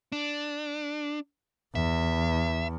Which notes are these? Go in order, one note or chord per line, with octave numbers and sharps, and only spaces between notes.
D4
E2 E5